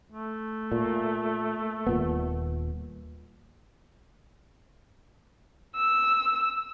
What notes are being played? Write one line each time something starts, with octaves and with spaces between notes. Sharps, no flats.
A3
A#2
D#1 A#2 B3
E6